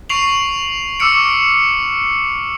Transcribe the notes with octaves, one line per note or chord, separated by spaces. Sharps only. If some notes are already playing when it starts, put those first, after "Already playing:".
C#6 C7 D7 F7 F#7
C#6 D6 E6 F6 C#7 D7